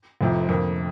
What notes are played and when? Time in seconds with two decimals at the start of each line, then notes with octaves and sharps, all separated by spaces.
0.21 F1 F2 C3 F3
0.49 F2 D3 A#3